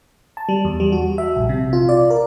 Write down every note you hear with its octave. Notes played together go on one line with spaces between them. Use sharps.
A5
G3
E2
G3
F#4
E5
A#1
C3
F4
D5
A#4